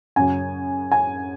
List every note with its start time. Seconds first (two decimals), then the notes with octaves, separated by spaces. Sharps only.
0.16 F#2 C#3 F#3 G#5
0.92 G#5